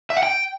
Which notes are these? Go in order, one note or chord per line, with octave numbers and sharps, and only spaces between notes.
E5
F#5
G5